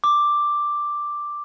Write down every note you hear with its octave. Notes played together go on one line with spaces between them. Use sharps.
D6